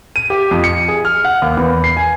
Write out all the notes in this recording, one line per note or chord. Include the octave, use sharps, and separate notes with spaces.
D#7
G4
F2
C#7
G#4
F6
F#5
D#2
E2
C7
G#5